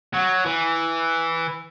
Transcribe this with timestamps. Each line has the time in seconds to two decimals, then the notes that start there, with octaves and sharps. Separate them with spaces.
0.14 F#3
0.46 E3